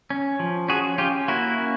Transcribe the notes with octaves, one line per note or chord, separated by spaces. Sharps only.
C#4
F3
C#4 F#4 G#4
C#4 F4 G4
A#3 E4 F#4
C#4